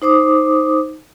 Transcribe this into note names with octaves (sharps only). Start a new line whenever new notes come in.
D#4 C5 D6 D#6